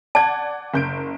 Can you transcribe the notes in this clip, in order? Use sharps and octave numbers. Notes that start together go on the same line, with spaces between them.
D5 F#5 A5 G#6
F#1 G6 D7